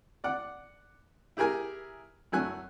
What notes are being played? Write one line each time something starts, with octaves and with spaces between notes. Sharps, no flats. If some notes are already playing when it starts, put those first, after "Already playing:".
D5 F#5
E4 G4 G#4 A#4 G#5
F#2 F#3 A3 G#5 F#6